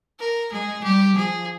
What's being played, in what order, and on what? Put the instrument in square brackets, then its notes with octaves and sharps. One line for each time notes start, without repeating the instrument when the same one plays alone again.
[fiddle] A#4
[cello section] G#3 [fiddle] G#4
[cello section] G3 [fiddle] G4
[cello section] F3 [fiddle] G#4